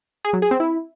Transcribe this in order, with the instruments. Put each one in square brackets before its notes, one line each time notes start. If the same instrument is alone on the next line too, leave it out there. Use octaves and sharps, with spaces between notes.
[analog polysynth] G#4
F#3
G#4
C4
E4